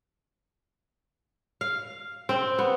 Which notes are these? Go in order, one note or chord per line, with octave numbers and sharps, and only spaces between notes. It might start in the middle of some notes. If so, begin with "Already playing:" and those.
F5
C4
B3